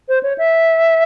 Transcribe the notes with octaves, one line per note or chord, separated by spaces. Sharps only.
C5
C#5
E5